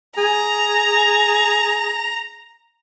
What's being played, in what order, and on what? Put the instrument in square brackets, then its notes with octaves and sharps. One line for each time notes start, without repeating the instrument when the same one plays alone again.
[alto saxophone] G#4 [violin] A#5